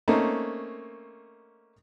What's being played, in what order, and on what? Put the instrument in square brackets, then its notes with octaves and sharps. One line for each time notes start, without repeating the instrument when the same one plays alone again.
[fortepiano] A3 A#3 C4 C#4 D#4